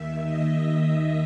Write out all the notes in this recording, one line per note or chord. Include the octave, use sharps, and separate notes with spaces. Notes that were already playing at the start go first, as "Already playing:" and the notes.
Already playing: D#2 D#3 E5
D#5